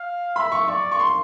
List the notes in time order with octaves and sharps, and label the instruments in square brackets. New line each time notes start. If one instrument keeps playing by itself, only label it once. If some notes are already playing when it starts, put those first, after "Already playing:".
Already playing: [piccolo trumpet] F5
[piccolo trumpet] E5 [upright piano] B5
[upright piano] C#6
[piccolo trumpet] D5 [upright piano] C#6
[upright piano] C#6
C6